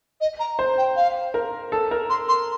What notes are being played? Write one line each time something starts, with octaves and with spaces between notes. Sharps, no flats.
D#5
A#5
C5
G5
F5
A#4
A4
A#4
C6
C6